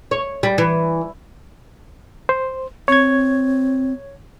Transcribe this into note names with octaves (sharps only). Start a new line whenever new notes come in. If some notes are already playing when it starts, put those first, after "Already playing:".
C#5
G3
E3
C5
C4 C#5 G#6